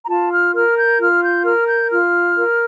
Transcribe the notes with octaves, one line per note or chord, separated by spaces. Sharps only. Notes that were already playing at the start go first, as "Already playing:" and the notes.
A#5
F4 A5
F6
A#4 F6
G6
F4 F6
G6
A#4 F6
G6
F4 F6
A#4